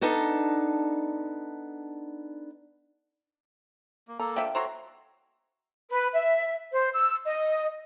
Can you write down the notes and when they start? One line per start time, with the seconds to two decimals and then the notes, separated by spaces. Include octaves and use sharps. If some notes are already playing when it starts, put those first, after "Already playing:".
0.01 B3 D4 D#4 A4
4.08 A#3
4.19 A#3 A4 A#5
4.36 D3 F3 E5 G5
4.55 F#4 A4 C5 C#5 A#5 C6
5.90 B4
6.14 E5
6.72 C5
6.94 E6
7.25 D#5